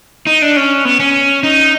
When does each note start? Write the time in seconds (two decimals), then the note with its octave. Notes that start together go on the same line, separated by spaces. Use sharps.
0.27 D#4
0.42 D4
0.56 C#4
0.85 B3
1.00 C#4
1.44 D#4